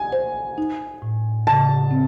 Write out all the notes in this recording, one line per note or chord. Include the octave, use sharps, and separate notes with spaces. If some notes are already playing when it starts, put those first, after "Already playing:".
Already playing: G#5
C5
D#4
A2
C#3 A5
C4